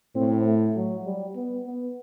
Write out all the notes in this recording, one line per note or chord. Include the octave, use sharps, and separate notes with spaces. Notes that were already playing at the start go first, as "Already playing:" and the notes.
A2 C4
A3
F#3
G3
B3
B3